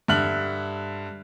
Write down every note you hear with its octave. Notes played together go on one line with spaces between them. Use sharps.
G2 D3 E5 F6 F#6 F#7